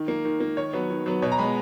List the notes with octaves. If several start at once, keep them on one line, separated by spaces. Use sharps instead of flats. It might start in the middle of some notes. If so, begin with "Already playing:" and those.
Already playing: D#3
A#3
D#3
A#3
D#3 C#5
F#3 B3
D#3
F#3 B3
B2 C#5
A#5
G#3 B3 B5